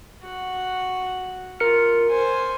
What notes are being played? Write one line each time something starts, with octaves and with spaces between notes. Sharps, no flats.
F#4
F4 A#4 F6 C#7
C5 G#5